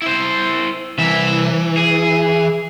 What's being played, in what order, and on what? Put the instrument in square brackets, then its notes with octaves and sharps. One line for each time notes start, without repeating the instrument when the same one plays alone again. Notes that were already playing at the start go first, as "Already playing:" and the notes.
[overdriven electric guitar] E4 C5
[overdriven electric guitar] C2 E5 [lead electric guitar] E3
[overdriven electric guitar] G#4